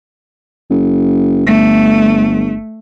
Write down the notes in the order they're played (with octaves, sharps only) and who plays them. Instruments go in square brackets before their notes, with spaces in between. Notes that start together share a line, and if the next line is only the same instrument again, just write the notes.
[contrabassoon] F#1
[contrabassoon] G1 [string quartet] A3